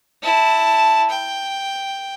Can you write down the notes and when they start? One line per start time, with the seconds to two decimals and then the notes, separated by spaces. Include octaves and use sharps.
0.23 E4 A5
1.10 G5